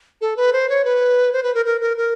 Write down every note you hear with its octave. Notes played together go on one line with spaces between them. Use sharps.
A4
B4
C5
C#5
B4
C5
B4
A#4
A#4
A#4
A#4